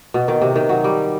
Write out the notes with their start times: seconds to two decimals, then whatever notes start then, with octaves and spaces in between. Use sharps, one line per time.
0.14 B2
0.28 D#3
0.42 C3
0.56 D#3
0.69 F#3
0.84 G3